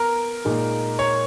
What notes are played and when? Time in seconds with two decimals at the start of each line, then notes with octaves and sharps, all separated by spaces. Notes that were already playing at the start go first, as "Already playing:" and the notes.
Already playing: B3 A#4
0.45 A#2 G#3 D#4
0.99 C#5